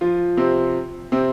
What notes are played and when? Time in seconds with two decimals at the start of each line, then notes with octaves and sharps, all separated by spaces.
0.01 F3 F4
0.37 C3 C4
1.12 C3 C4